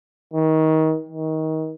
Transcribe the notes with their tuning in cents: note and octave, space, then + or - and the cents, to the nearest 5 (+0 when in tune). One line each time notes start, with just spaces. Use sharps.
D#3 +25
D#3 +25